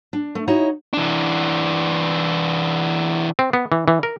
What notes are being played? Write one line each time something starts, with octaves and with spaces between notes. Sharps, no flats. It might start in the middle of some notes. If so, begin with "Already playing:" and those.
D4
A3
D#4 E4 F#4 C#5 D#5
E3 D4
C4
B3
E3
E3
A#4